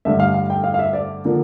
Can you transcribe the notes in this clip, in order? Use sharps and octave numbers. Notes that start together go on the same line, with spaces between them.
G2 D3 A3 E5
F5
F5
G5
F5
F5
E5
D5
D3 F3 A#3